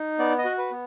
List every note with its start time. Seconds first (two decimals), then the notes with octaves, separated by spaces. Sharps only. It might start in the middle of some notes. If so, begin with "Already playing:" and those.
Already playing: D#4
0.19 B3 D5
0.38 D#5
0.45 F#4
0.58 B4
0.71 B3